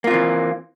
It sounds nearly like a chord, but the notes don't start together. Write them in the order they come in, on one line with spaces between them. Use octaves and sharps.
A#3 F4 C4 E3